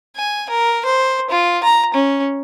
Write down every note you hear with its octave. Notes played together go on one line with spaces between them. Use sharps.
G#5
A#4
C5
F4
A#5
C#4